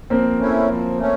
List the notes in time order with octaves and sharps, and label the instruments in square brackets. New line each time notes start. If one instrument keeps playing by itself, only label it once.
[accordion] F3 [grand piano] A#3 C4
[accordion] A3 C#4 E4
F3
A3 C#4